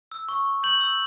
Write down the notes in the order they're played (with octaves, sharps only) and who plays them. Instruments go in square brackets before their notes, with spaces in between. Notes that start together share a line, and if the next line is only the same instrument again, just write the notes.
[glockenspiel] E6
C#6
C#6
G6 F#7
E6